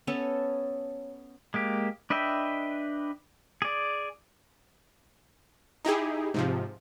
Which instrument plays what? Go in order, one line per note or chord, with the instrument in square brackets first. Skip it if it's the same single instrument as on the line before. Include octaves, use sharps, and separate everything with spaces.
[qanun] B3 C#4 A4 C#5
[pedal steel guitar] G#3 A#3 G4
D4 B4 D#5 E5 G5
G#4 D5
[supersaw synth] D#4 E4 G4 G#4
G#2 C3 F3